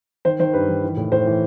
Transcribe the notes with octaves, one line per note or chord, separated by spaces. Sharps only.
D#3 C5
D#3 C5
G2 B4
D#3
E3
A2
A2 C5
E3